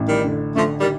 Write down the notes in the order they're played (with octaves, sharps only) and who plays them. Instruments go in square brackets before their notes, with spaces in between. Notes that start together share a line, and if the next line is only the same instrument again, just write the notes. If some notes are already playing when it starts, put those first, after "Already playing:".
Already playing: [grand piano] A1 A3
[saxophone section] D#3 G3
[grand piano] D3
[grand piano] D3 [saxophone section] F3 A3
[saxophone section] D#3 G3